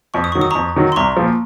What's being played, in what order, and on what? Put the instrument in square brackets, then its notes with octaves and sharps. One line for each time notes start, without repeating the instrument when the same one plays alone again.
[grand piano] F2 [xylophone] C#6
[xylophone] D#6
[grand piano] D#3 F#3 [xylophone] C#6
[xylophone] D#6
[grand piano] F2 [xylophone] A#5 C#6
[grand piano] D#3 F#3
[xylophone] C6
[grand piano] C2 [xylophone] A#5 C#6
[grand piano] A#2 F3